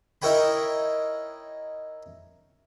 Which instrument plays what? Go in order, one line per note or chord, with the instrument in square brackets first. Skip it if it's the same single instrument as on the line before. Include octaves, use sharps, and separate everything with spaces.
[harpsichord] D#4 E4 A#4 C#5 G5 B5